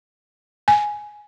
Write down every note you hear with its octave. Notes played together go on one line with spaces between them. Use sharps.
G#5